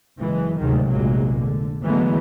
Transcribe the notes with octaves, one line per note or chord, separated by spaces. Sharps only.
F#1 E3 G#3
D2 G#2 C3 D#3 F#3 G#3
F1 A#1 F#3 G#3 A#3
D3
D3 E3 F#3 G#3 A3 B3